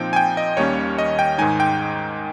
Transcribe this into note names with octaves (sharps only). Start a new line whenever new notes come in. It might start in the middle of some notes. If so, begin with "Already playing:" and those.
Already playing: A#2 F3 C4 D#4 G5
G#5
G5
D#5
D#2 D#3 G3 A#3 C#4 C#5
D#5
G5
G#2 D#3 G#3 D#4 G#5
G5